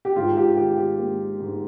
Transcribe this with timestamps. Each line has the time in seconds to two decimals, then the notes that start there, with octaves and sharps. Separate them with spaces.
0.05 G4
0.16 G#2 F4
0.37 G4
0.57 D#3 G4
0.78 G4
0.99 A#3
1.40 G#2